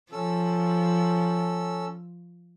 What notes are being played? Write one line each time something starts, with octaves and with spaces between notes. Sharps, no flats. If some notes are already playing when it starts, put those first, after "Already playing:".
F3 C#4 A4 E6